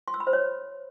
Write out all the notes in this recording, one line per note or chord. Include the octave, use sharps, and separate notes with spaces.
C6
E6
B5
C5
C#5